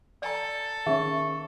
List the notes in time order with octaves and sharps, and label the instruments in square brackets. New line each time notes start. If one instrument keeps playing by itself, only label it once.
[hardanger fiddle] A4 [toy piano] D5 G#5 A#5
[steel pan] D#3 C#4 [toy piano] G#4 E5 [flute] C#6